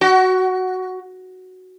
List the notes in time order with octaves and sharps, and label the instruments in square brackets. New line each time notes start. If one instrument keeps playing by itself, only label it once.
[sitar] F#4